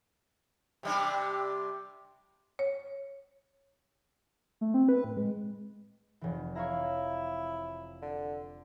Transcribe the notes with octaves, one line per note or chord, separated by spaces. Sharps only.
C3 G3 D4
C#5
A3
C4
B4
A2
G#3
F1 E3
E4 C#5 F5 A#5
D3